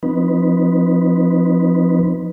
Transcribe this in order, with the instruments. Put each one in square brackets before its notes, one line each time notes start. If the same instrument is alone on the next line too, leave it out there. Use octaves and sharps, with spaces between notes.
[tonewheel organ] F3 C4 D#4 B4